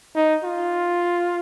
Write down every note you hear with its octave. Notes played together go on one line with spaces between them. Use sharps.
D#4
F4